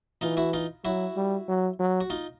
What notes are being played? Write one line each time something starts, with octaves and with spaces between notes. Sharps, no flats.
E3 D#4 F4
E4 F#4
D#4 F4
F#3 E4 F#4
G3
F#3
F#3
F#4
D#4 F4